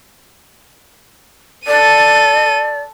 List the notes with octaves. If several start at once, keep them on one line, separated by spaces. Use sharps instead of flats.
A4 D5 D#7